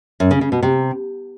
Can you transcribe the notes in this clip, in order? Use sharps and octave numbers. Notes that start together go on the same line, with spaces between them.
F#2
C#3
C#3
B2
C3